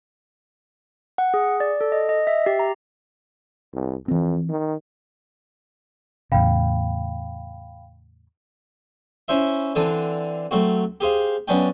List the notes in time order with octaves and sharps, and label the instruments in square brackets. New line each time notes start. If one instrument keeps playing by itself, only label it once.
[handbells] F#5
G#4
D5
A4
D#5
D#5
E5
G4
A#5
[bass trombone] C2
[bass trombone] F2 [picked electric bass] E3 C4
[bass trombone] D#3
[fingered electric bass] E2 A2 C#3 [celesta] F5 G5 B5
[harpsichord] C#4 E4 C5 E5
D3 E3 C4 D4
F#3 A3 C4 F#4
G4 G#4 C5 F5
F#2 B3 C#4 D4 D5 G5